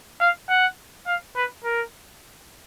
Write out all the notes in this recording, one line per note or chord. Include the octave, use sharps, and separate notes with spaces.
F5
F#5
F5
B4
A#4